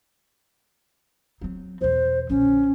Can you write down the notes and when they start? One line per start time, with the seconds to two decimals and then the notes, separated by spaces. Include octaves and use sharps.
1.41 F#3 C4
1.81 E2 B2 C5
2.30 A#1 D3 C#4